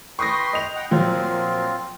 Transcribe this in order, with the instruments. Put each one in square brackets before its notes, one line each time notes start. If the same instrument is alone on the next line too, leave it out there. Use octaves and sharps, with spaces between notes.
[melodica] B4 G5 C6 [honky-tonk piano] C#6 D#6 A#6
[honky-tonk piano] D#5 F7
[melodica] F#5 G5
[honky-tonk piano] A#2 F3 F#3 [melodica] C4 F4